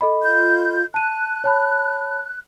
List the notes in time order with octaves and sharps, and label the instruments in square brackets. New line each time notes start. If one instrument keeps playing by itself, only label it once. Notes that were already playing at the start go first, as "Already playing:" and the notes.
[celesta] A4 D#5 B5
[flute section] F4 G6
[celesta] A5 D#7 [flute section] F#6
[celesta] C#5 A5 B5